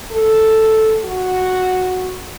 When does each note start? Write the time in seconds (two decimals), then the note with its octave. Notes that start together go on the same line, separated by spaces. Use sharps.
0.11 A4
1.05 F#4